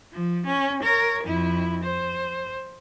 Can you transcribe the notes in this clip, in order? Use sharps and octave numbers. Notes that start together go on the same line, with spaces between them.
F3
C#4
A#4 C#5
F2 E4
C5